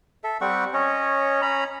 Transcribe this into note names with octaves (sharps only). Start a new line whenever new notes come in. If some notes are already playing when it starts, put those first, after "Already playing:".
A4 E5
G3 C4 F#5 C#6
C#4 C#5 D#5
C#4 A#5 B5